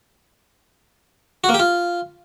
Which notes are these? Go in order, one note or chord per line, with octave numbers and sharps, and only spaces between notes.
F#4
A#3
G4
F4